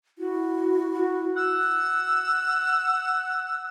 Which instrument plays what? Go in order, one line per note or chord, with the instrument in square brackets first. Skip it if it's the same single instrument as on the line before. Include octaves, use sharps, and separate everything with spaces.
[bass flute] E4 [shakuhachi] F#4
[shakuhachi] F#4
[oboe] F#5 [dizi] E6